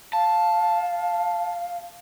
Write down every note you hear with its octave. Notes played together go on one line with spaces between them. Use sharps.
F5 A5